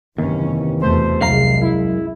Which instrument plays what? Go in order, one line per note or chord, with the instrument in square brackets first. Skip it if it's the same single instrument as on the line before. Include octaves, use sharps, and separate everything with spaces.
[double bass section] F#1 C#4 [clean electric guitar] D#2 [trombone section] C3 E3
[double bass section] E2 B2 A3 [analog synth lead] C5
[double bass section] C2 [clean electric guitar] F#2 F5 A#5 [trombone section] G#3 [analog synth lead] C7
[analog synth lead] E4